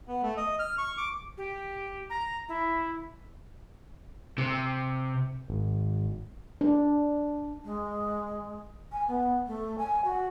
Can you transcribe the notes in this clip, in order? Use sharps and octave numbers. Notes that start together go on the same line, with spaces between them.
B3
A3
D#5
F6
C#6
D6
G4
A#5
E4
C3
G#1
D4
G#3
G#5
B3
A3
G#5
F#4